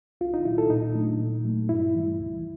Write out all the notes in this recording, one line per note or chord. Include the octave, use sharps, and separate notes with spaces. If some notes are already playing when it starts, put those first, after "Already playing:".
C2 F4
D#4
A#2 F#3 E4
A4
A#2 D#4
F#3 A3 D4
A#2
F#3 A3
G2 E4
E3 G3
C#2